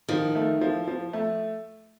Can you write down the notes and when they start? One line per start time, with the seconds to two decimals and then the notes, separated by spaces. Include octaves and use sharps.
0.08 D#3 F3
0.35 A3
0.61 F3
0.88 F3
1.13 A3